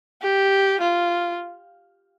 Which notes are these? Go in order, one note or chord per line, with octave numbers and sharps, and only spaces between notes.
G4
F4